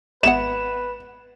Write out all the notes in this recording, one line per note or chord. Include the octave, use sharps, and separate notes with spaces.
G#1 B3 B4 E5 F#5 E7